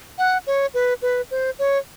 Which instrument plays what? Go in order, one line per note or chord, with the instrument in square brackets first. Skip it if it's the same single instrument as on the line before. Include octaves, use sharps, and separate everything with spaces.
[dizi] F#5
C#5
B4
B4
C5
C#5